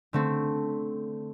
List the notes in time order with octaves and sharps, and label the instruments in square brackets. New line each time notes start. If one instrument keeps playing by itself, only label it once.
[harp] D3 A3 C4